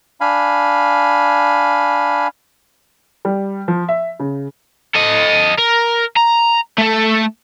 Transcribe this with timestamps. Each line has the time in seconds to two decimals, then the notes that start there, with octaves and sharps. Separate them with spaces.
0.21 D4 F5 G#5 B5
3.25 G3
3.68 F3
3.89 E5
4.20 C#3
4.95 A4 D#5
5.59 A#4
6.16 A#5
6.78 A3 A4